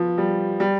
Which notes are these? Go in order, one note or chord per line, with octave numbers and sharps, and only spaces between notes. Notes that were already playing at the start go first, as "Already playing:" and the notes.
Already playing: F3 B3
G3
G3